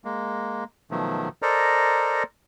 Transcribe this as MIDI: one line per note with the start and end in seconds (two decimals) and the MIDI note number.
0.04 0.64 56
0.04 0.64 58
0.91 1.29 47
0.91 1.29 51
0.91 1.29 53
0.91 1.29 54
0.91 1.29 57
1.42 2.23 69
1.42 2.23 70
1.42 2.23 72
1.42 2.23 74
1.42 2.23 75
1.42 2.23 82